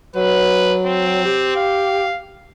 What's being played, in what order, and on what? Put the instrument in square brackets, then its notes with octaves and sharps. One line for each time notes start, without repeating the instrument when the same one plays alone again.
[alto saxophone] F#3 [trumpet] B4
[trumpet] C4
[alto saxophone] G4
[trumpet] F5